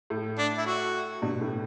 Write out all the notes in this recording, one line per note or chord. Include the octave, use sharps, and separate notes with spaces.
A2
D4
E4
F#4
G2 B2
A2